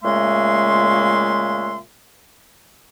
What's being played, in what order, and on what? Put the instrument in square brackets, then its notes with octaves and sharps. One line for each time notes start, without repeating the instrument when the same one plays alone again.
[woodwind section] A#2 C#3 G#3 A3 E5 C6